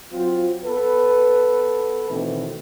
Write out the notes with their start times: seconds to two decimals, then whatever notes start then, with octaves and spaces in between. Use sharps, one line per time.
0.12 F#3 C4 F4
0.64 B3 A4 B4
2.10 B2 D#3 E3 A3 C4